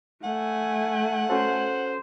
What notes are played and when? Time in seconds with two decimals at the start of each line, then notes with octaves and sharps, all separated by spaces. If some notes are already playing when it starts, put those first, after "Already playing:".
0.23 A3 F#5 G#5
1.30 C#4 F#4 A4 C5